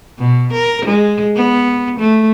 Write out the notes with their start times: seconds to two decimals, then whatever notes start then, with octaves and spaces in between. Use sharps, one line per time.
0.19 B2
0.53 A#4
0.86 G#3
1.36 B3
2.00 A3